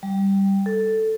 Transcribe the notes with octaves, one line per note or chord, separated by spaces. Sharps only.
G3
A4